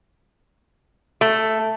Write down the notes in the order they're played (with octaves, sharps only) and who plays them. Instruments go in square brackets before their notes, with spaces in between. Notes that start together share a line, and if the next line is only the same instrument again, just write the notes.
[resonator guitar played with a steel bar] A3